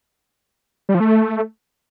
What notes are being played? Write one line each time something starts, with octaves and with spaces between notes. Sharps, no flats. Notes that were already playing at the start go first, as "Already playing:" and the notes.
G3
F3
A3